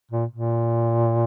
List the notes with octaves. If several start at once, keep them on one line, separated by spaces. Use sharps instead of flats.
A#2
A#2